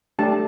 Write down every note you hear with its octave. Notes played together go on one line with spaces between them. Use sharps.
A3 D4 G4 A5